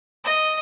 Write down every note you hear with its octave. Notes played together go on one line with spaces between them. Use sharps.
D#5